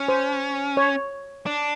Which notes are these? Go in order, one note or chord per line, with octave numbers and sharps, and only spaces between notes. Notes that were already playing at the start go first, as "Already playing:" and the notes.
Already playing: C#4
C5
C#5
D4